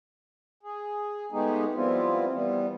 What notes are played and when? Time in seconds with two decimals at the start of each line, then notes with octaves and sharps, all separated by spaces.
0.63 G#4
1.32 G#3 A3 B3 D#4 G4 G#4
1.75 F3 G3 B3 C4 E4 F4
2.33 E3 G3 B3